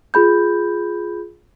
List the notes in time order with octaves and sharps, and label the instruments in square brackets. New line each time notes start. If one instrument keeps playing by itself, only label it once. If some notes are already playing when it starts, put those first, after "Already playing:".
[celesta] F4 G#4 B5 G6